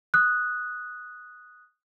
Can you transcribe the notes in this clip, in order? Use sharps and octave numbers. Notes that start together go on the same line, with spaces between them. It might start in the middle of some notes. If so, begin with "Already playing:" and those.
D#6 F#6